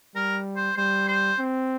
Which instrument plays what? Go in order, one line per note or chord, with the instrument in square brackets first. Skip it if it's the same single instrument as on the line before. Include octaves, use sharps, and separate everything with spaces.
[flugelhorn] G3 [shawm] A#4
[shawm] C5
[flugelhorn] G3 [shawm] C5
[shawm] C5
[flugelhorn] C4